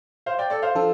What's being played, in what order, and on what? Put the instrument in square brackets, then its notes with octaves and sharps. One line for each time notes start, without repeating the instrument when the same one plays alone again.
[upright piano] C5 F5
D5 G5
A4 D5
C5 F5
[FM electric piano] F3 D4 A4